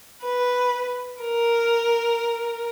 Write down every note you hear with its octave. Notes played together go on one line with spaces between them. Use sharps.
B4
A#4